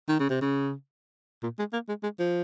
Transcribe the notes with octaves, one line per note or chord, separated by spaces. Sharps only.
D#3
C#3
C3
C#3
A#2
G#3
A#3
G#3
G#3
F3